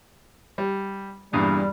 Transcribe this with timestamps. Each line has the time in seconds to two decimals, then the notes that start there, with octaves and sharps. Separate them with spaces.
0.58 G3
1.33 E2 G2 A#2 G3